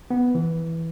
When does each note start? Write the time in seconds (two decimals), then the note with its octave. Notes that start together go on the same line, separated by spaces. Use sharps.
0.10 B3
0.35 E3